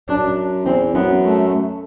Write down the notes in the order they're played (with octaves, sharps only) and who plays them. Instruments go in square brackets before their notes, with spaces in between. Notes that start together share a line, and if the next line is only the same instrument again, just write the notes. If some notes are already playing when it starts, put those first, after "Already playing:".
[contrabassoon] F#2 [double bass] D4
[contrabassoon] E2 [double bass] C4
[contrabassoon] F#2 [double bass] B3
[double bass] A3